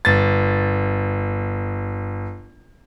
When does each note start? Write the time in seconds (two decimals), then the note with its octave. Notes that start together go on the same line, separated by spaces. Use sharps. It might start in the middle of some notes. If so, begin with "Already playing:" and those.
0.05 G1 A6